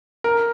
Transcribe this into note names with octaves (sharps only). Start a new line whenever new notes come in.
A#4